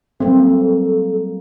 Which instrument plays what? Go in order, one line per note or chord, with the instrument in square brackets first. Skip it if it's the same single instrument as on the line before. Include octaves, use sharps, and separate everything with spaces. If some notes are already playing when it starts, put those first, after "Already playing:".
[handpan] F#3 G3 A#3 [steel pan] C4 [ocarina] A4